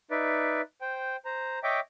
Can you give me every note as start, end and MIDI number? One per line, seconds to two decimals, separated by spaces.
0.11 0.61 63
0.11 0.61 71
0.11 0.61 74
0.11 0.61 76
0.81 1.16 72
0.81 1.16 79
1.25 1.59 72
1.25 1.59 82
1.63 1.80 73
1.63 1.80 75
1.63 1.80 76
1.63 1.80 79
1.63 1.80 86